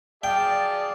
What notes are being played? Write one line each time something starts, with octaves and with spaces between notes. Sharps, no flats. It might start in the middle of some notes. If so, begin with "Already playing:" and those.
G#4 D5 F5 G5 A5